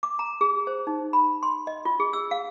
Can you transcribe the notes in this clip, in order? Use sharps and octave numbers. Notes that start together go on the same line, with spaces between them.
D6
A#5
G#4
C5
D#4
B5
C6
D#5
F4
G#4
E6
F5